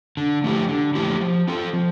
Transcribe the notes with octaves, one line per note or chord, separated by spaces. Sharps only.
D3
F3 A3 E4 G4
D3
F3 A3 E4 G4
F3
C4 F4 A4
F3